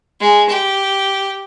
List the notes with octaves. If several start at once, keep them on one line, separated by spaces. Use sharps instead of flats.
G#3
G4